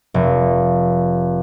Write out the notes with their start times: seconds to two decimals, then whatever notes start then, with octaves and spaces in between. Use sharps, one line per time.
0.14 F1